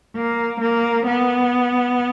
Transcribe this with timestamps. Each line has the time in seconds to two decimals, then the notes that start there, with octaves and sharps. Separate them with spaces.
0.16 A#3
0.61 A#3
1.06 B3